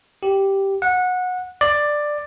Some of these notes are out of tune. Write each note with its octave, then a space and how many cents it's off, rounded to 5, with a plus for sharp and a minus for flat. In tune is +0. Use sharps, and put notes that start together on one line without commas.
G4 -5
F#5 -20
D5 +10